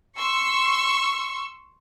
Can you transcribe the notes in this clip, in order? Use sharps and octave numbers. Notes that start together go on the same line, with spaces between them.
C6 C#6 E6